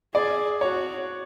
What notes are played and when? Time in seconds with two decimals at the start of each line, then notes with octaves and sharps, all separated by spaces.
0.14 G#4 D5
0.61 F#4 C#5